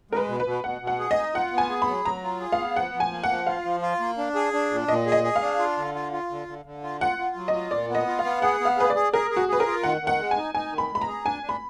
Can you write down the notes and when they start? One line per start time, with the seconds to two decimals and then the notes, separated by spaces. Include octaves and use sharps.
0.11 G#3 A#4
0.17 B4
0.28 B2
0.40 B4
0.46 B2
0.64 B2 F#5
0.81 B2
0.87 F#5
0.99 G#4
1.11 D#5
1.17 D#4
1.34 F4 F#5
1.53 B3
1.58 G#5
1.70 G#4
1.82 B5
1.87 F#3
2.05 F#3 A#5
2.23 F4
2.41 G#4
2.52 F5
2.59 B3
2.76 F3 F#5
2.94 F3
3.00 G#5
3.11 A#3
3.24 F#5
3.29 F3
3.47 F4 F5
3.64 F3
3.82 F4
4.00 A#3
4.18 D4
4.35 G#4
4.53 D4
4.71 A#2
4.88 A#2 D#5
5.06 G#4
5.12 D#5
5.24 G#4
5.36 F5
5.42 D4
5.59 F4
5.77 D3
5.95 F4
6.12 F4
6.30 D3
6.48 D3
6.65 D3
6.83 F4
7.01 F4 F#5
7.19 F4
7.36 F#3
7.48 D#5
7.54 F4
7.71 A#2 D5
7.90 B3
7.95 D#5
8.07 F4
8.19 F5
8.24 B3
8.42 G#4 F#5
8.61 B3 F5
8.77 G#4 B4
8.90 D5
8.95 G#4
9.13 G#4 A#4
9.31 G#4
9.36 F#4
9.49 G#4 B4
9.60 A#4
9.66 F4
9.83 D#3 F#5
10.02 D#3
10.07 F#5
10.19 G#3
10.31 G#5
10.37 D#4
10.55 D#4 G#5
10.72 D#3
10.78 B5
10.90 G#3
10.95 B5
11.01 A#5
11.07 G#4
11.25 D4 G#5
11.43 D4
11.49 B5